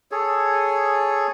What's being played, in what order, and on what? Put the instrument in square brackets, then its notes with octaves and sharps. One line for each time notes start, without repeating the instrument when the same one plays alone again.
[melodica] G#4 A4 C#5